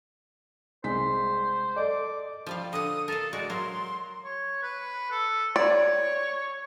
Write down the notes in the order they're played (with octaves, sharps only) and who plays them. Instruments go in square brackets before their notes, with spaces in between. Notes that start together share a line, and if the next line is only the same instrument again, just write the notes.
[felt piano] C2 G#3 B6 [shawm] C5
[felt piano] A4 D5 D#5 [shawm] D6
[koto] F3 G3 F5
[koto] D3 F#5 [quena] D#6
[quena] A4 [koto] A#4 F5
[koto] G#3 F#4 [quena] D5
[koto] F#3 A#4 F5 [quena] C6
[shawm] C#5
B4
A4
[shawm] C#5 [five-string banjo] D5